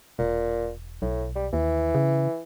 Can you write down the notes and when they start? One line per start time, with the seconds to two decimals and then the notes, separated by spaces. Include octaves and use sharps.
0.19 E1 A#2
1.02 B1 A2
1.36 G3
1.53 D#2 E3
1.95 C#3